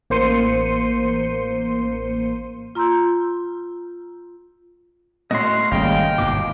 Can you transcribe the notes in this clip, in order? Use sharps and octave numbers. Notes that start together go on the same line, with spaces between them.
A1 A#3 C5 C6 C#7 D#7
F4 A#5 C6 E6 G6
A2 C#4 F#4 A#4 D#5 C6
G#1 C#3 G3 A#3 D#5 F5 G5
G1 G#2 B2 D6